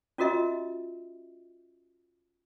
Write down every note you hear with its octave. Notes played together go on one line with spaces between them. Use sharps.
C#4 F4 F#4 A#4 D#5 E5